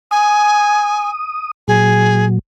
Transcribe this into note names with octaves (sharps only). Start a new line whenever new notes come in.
G#5 D#6
A#2 F#3 G#4